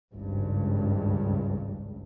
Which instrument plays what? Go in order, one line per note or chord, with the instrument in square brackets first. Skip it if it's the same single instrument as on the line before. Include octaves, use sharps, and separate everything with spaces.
[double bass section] G#1 C#2 G2